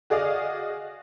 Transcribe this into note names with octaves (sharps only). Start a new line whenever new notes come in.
F#4 G#4 D5 D#5 F5